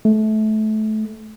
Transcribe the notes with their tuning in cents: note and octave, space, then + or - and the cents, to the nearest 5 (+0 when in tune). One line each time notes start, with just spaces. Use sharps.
A3 -25